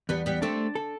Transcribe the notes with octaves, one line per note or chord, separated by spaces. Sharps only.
E2 G3 B3
G3 B3
A3 C4 D4
A4